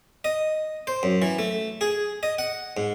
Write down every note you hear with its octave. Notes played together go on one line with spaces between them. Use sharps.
D#5
C5
F#2
E3
A3
G#4
D#5
F#5
G#2